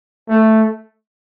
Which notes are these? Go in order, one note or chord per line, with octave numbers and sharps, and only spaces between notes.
A3